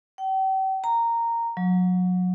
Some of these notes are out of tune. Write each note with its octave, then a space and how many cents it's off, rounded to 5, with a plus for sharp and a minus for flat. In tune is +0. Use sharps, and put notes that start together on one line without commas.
G5 -40
A#5 -10
F#3 -30